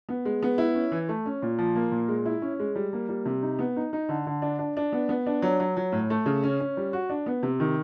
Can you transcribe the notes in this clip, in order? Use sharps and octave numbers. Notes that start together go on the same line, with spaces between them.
B3
G#3
B3
E4
C#4
E3
A3
C#4
A#2
F3
A#3
A#2
G#3
E4
C#4
G#3
G3
A#3
G3
C3
D#4
B3
D#4
D#4
D3
D3
D4
D4
D4
B3
B3
D4
F#3
F#3
F#3
A2
A3
C#3
C#4
C#4
G3
F#4
D4
B3
C3
D#3